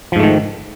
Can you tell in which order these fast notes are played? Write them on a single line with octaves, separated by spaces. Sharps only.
F3 G#2 A3 D#3